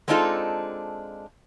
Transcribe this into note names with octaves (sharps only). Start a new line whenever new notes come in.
G#3 C4 D4 D#4 F4 A4